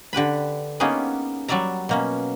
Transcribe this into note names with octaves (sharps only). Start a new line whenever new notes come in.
D3 G4 B4 B5
A#3 B3 C#4 D#4 G4 G#4
F#3 G3 D5 E5 A#5
B2 A#3 C#4